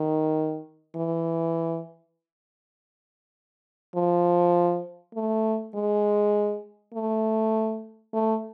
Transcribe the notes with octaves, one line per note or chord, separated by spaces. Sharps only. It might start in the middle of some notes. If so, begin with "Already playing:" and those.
Already playing: D#3
E3
F3
A3
G#3
A3
A3